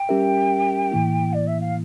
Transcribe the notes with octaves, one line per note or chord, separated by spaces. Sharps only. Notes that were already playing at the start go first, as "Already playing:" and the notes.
Already playing: G5
G3 C#4 G4 A#4 E5
A2 E3 A#3 E4
D5
E5
F5